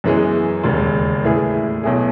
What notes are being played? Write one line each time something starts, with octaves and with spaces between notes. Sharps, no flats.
F#2 E3 G#3 B3
E1 D#2 C#3
A2 E3 A3 E4 G#4
B1 B2 A3 E4 G#4